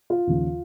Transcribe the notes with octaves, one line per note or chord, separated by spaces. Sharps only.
F4
D#2 C#3 F3